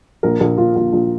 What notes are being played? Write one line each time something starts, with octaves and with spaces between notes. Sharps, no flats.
A#1 A#4
A#1 A#4
A#1 F4
A#1 F4
A#1